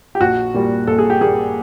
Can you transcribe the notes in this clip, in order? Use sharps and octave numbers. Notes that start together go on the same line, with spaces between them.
G4
A#1 F#4
A#2 G3 A#3
A#1 A4
G#4
G4
A#2 G3 A#3 G#4